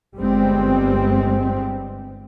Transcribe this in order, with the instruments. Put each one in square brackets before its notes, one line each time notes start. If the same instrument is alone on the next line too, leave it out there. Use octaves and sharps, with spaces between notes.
[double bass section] G1 G3 G#3 C4